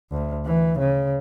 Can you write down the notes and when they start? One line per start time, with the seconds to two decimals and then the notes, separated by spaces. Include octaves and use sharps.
0.11 D2
0.46 E3
0.79 C#3